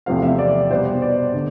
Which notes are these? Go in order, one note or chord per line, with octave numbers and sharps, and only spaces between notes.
E2 C3 F3 A3 C4 F5
E5
D5
B2 G3 B3 C5
D5
D3